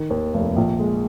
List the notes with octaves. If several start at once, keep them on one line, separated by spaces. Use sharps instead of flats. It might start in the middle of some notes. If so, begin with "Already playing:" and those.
Already playing: D#3
D#2
F1
A#1
G#3